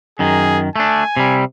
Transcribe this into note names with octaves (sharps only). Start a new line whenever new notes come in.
F#2 D#3 G#4
A3 D4 G#5
C3 G3